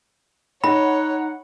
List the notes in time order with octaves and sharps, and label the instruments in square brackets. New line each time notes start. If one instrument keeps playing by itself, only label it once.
[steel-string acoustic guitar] D#4 [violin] C#5 [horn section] F#5 [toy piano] B5